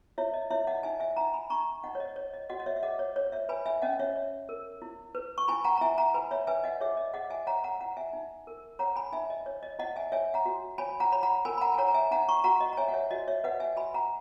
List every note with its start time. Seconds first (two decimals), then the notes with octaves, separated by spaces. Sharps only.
0.18 E4 C#5 E5
0.34 D#5
0.51 E4 C#5 E5
0.67 D#5 F#5
0.83 D#4 E5 G#5
1.00 E5 G#5
1.16 D#4 F#5 A#5
1.34 G#5 B5
1.50 D#4 A#5 C#6
1.84 D#4 D#5 F#5
1.95 C#5
2.00 D#5
2.16 C#5
2.34 D#5
2.49 F#4 D#5 F#5
2.60 D#5
2.66 C#5 E5
2.76 E5
2.83 G#4 D#5 F#5
2.99 C#5
3.16 C#5
3.32 C#5 E5
3.49 B4 G#5 B5
3.66 E5 G#5
3.82 C#4 D#5 F#5
4.00 C#5 E5
4.16 C#5
4.49 A#4
4.82 E4
5.15 B4
5.38 C#6
5.48 E4 G#5 B5
5.64 F#5 A#5
5.77 A#5
5.81 E4 E5 G#5
5.98 F#5 A#5
6.14 B4 G#5 B5
6.31 C#5 E5
6.47 B4 E5 G#5
6.64 D#5 F#5
6.81 G#4 C#5 E5
6.97 D#5
7.14 G#4 D#5 F#5
7.30 E5 G#5
7.47 C#5 F#5 A#5
7.64 F#5 A#5
7.80 E4 F#5 A#5
7.97 E5 G#5
8.13 D#4
8.47 A#4
8.79 C#5 F#5 A#5
8.96 G#5 B5
9.12 D#4 E5 G#5
9.30 D#5
9.46 C#5
9.63 D#5
9.79 E4 D#5 F#5
9.96 E5 G#5
10.12 C#5 E5 G#5
10.34 F#5 A#5
10.46 F#4
10.78 C#5 G#5 B5
11.00 F#5 A#5
11.12 C#5 B5
11.23 F#5 A#5
11.45 A#4 G#5 B5
11.58 B5
11.61 F#5 A#5
11.74 G#5
11.78 C#5 F#5 A#5
11.88 A#5
11.94 E5 G#5
12.11 D#4 F#5 A#5
12.29 A#5 C#6
12.44 F#4 F#5 A#5
12.61 D#5
12.73 A#5
12.77 C#5 E5 G#5
12.88 F#5
12.94 C#5 E5
13.11 F#4 D#5
13.28 C#5 E5
13.44 B4 D#5 F#5
13.60 E5 G#5
13.77 F#4 G#5 B5
13.94 F#5 A#5